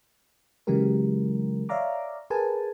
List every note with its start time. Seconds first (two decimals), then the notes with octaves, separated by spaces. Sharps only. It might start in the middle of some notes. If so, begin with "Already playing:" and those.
0.67 C#3 E3 F#3 G#3 G4 A#4
1.69 C#5 D5 E5 F5 A#5 D6
2.30 G#4 A#4 B4 G#5 A5